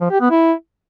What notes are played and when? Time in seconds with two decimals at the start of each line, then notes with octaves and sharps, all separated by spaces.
0.01 F3
0.11 G4
0.21 B3
0.31 E4